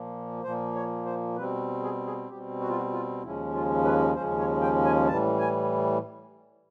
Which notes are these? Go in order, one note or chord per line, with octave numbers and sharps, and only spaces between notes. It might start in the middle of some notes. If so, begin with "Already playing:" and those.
Already playing: A#2 F3 A#3
A#2 F3 A#3 C5
C#5
C5
B2 G3 C4 B4
G#4
G#4
B2 G3 C4 G4
F#4
F4
F#4
F4
D#2 C#3 F3 G#3 C#4 E4
F4
B4
D#2 C#3 F3 G#3 C#4 C5
C#5
G5
G#5
A2 E3 G3 A5
G#5